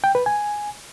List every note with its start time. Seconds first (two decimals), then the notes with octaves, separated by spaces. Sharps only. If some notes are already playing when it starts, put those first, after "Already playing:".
0.04 G5
0.15 B4
0.26 G#5